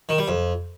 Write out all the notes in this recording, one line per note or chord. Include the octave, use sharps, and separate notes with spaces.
D#3
G3
F2